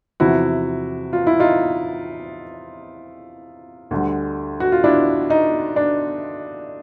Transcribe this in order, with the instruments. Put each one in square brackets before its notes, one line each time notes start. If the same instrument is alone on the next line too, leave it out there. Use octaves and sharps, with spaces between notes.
[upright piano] E2 C3 F3 E4 F#4
F4
E4
D#4 F4
D2 D3 G3
F#4
F4
D4 E4
D#4
D4